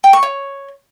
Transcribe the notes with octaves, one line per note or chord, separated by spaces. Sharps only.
G5
C#6
C#5